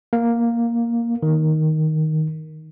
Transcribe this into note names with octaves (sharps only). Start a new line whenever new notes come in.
A#3
D#3